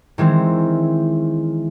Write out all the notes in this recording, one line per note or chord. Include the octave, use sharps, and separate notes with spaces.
D#3 E3 G#3 C4